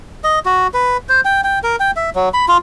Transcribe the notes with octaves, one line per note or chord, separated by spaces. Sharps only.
D#5
F#4
B4
C5
G5
G5
A#4
G5
E5
F#3
B5
F4